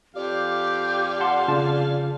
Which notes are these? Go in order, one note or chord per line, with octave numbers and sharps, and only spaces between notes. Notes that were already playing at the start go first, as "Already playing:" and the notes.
F2 G4 D5 F5
F#5 A5 C6
C#3 F4 A5